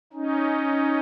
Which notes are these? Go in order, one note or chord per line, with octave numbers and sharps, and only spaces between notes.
C#4 D#4